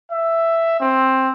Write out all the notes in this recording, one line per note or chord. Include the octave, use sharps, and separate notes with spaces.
E5
C4